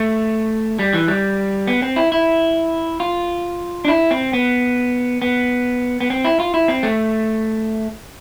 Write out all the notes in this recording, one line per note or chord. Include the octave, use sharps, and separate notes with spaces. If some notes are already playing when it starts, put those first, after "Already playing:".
Already playing: A3
G3
E3
G3
B3
C4
E4
E4
F4
D4
E4
C4
B3
B3
B3
C4
E4
F4
E4
C4
A3